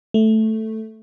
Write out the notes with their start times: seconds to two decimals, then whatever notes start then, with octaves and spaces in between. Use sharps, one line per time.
0.14 A3